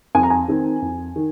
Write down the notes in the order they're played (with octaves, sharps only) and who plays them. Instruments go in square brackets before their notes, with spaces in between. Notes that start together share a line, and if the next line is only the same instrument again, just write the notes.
[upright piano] F2 G#5
A#5
G#5
D#3 C4
F2
D#3